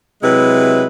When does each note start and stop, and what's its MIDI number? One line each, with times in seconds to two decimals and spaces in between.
0.23 0.85 48
0.23 0.85 54
0.23 0.85 56
0.23 0.85 64
0.23 0.85 71